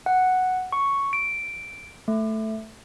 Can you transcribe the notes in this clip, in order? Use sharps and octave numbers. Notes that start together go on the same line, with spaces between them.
F#5
C#6
D7
A3